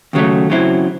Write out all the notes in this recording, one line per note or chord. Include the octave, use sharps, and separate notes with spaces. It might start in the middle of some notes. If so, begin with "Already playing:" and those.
D#2 C#3 F#3 A3
C#3 F#3 C4 E4